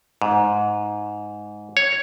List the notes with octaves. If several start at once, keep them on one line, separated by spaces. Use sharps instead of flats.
G#2
C#5